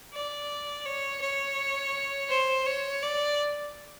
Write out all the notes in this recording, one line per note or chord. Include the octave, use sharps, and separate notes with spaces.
D5
C#5
C#5
C5
C#5
D5